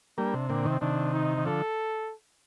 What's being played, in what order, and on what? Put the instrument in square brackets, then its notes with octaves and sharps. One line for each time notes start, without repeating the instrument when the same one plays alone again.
[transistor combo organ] G3 A#3 [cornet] D4
[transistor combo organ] C3
[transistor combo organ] A#2 D3 [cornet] C4
[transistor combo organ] C3 D#3
[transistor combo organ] C3 D#3 [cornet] D4
[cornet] D#4
[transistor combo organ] D#3
[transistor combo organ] D3 F3 [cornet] A4